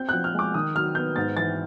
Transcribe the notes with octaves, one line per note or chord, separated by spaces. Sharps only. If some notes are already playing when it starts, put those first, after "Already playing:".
Already playing: C4 G6
F3 F#6
F6
G#3 D6
D#3 D#6
F#3 F6
B3 G6
G#2 A6
E3 A6